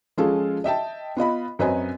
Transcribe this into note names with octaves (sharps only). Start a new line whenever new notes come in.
F3 G#3 C#4 F4 G#4 A4
D#5 E5 G5 A5
B3 F4 D#5 B5
F#2 C4 B4 C#5 D#5 G#5